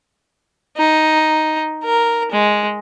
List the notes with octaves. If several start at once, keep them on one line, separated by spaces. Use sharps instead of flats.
D#4
A#4
G#3